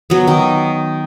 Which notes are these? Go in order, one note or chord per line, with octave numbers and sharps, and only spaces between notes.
F#3 B3
D#3